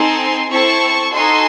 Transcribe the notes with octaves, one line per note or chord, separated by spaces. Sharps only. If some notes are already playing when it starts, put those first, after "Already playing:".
Already playing: C4 D#4 A4 G#5 C6
C4 E4 A4 A5 C#6
D#4 F#4 A4 G#5 C6